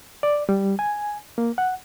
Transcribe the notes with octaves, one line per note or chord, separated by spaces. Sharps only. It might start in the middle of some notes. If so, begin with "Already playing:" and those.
D5
G3
G#5
A#3
F#5